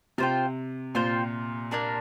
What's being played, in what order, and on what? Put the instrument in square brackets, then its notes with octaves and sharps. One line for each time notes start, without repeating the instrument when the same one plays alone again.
[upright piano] C3 [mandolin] F4 C5 G5
[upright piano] A#2 [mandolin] F4 C5 G5
[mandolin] A#3 D4 A#4